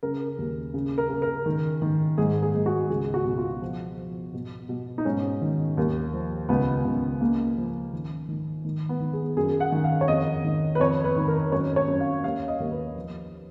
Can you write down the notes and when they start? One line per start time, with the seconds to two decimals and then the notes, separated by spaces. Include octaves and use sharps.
0.03 C#3 A#4
0.38 D#2
0.74 C#3
0.98 A#4
1.10 C#3
1.22 A#4
1.46 D#3
1.82 D#3
2.18 G#2 G#4
2.42 G#4
2.54 G#2
2.66 F#4
2.90 C#2 G#4
3.14 F#4
3.25 B2
3.38 F4
3.62 F3
3.97 F3
4.34 B2
4.69 B2
4.98 D#4
5.05 G#2 C#4
5.41 D#3
5.77 D#2
6.13 F3
6.49 C#2 B3
6.85 C#2
7.21 C#3 A#3
7.57 F3
7.93 D#3
8.28 D#3
8.65 D#3
8.89 B3
9.00 D#3
9.13 G#4
9.37 F#2 G#4
9.60 F#5
9.72 D#3
9.84 F5
10.01 C#5
10.08 F2 D#5
10.44 D#3
10.75 B4
10.80 F2 C#5
11.04 B4
11.16 D#3
11.28 A#4
11.52 F#2 C#5
11.76 C#5
11.87 F#2
12.00 F5
12.24 D#2 F5
12.48 D#5
12.60 D#2
12.71 B4
12.96 F3